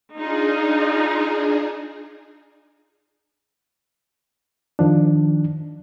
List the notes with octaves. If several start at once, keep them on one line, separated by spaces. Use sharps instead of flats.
D4 D#4 F4 G#4
D#3 F3 D4